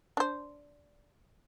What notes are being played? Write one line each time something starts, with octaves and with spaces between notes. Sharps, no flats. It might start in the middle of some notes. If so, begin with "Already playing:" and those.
D4 C5